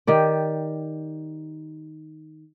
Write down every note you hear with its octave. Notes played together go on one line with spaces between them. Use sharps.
D#3 G4 D5